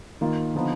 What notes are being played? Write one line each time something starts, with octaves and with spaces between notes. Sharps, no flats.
D#3 A#3 F4
D3 F3 B3 D#4